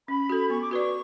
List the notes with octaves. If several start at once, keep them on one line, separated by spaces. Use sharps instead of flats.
C#4 B5
F#4 A4
B3 C#6
D6
F#4 B4 D5 C#6